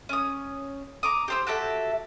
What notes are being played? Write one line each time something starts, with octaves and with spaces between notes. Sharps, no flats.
C#4 D#6
A#5 D6 D#6
G4 C5 E6
F#4 G4 A4 E5